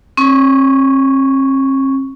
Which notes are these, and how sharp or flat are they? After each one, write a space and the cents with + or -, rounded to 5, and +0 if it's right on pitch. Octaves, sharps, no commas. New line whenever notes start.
C4 +45 C#6 +0